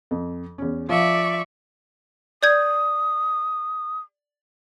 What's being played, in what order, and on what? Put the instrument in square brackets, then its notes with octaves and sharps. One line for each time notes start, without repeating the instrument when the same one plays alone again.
[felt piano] F2
E2 C#4
[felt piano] F3 F4 [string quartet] D5 E5 C#6
[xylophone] D5 G6 G#6 [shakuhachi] D#6